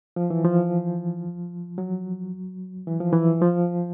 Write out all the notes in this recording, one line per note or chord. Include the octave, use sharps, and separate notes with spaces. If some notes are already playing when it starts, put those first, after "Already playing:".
F3
E3
F3
F#3
E3
F3
E3
F3